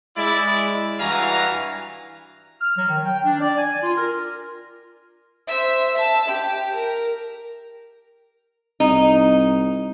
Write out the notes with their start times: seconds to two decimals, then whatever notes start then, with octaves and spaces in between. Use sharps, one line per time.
0.17 G#3 E4 D5
0.99 G2 E3 F#4 F5 G#5 A#5
2.61 F6
2.76 F#3
2.89 D#3
3.05 G5
3.24 D4
3.40 D5
3.57 G#5
3.82 F4
3.96 A#4
5.47 C5 E5
5.97 E5 A5
6.28 G4
6.74 A#4
8.80 C2 D#4